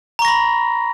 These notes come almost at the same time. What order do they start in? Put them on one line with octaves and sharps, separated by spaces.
A#5 C#6 A#6 B5